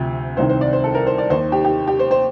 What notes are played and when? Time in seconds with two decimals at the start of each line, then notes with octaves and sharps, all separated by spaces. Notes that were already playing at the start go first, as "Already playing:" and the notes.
Already playing: D2 C3 F3
0.37 C2 C3 D#3 C5
0.49 C5
0.61 D5
0.73 C5
0.84 A4
0.95 A#4
1.07 C5
1.18 D5
1.30 D#2 D#3 C5
1.52 G4
1.64 G4
1.87 G4
1.99 C5
2.11 C5